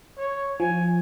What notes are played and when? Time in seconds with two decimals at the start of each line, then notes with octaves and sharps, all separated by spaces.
0.18 C#5
0.60 F3 G#5